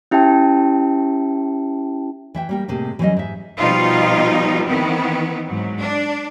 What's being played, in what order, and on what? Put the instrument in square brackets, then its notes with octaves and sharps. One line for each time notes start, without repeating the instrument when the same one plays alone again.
[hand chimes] C#4 E4 G4 E5 G5 A5
[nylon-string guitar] E3 E5 G5
G3 A#3 G5
A2 C3 G#3 A#3
E3 F#3 G3 C4 C#4 D#5
G#2 E5
[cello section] B2 F3 G3 D#4 F4
D#3 E3 B3 C4
G#2 F#3
D4